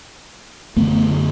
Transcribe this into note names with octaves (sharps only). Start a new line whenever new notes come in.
F#2 D3 A3 B3